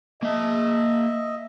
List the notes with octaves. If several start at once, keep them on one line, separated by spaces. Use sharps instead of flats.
A#3 D#5 E5 A5